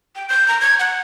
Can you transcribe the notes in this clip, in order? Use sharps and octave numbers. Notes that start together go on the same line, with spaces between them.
G5
G6
A#5
G#6
F#5